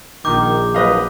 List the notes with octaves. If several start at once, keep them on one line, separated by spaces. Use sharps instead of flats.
A#1 D#3 D6 G6
F#3 B4 D#5 F5